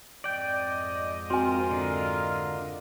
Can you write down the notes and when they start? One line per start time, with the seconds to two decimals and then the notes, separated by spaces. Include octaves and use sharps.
0.24 F2 G#2 D5 D#5 G5
1.30 C4 F4 F#4 A#4 G#5
1.71 D3